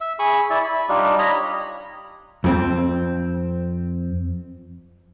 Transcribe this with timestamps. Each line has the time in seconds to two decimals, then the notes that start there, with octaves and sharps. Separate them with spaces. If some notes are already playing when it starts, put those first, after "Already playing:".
0.01 E5
0.19 G#4 B5 C#6 D#6
0.50 E4 D5 E5
0.64 B5
0.89 G3 D4 D#4 F4
1.19 C#5 D#5 A#5 B5
2.44 F2 C4